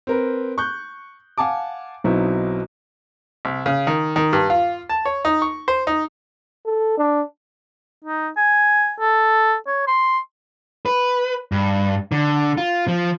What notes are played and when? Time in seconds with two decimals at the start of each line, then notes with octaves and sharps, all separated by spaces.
0.07 C4 A#4 B4
0.58 C#6 F#6 G6
1.38 F5 F#5 G#5 A5 D6
2.04 B1 B2 F#3 C4 D#4 E4
3.45 C2
3.66 C#3
3.87 D#3
4.16 D#3
4.33 G2
4.50 F4
4.89 A5
5.05 C#5
5.25 D#4
5.42 C#6
5.68 C5
5.87 D#4
6.66 A4
6.98 D4
8.05 D#4
8.37 G#5
9.01 A4
9.67 C#5
9.87 C6
10.86 B4
11.52 G2
12.12 D3
12.58 F4
12.88 F3